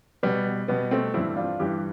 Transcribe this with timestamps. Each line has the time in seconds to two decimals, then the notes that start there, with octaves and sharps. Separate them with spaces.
0.23 B2 G3 B3
0.68 B2 G3 B3
0.91 A3 C4
1.14 G2 E3 G3 C4 E4
1.36 D4 F4
1.60 G2 E3 G3 E4 G4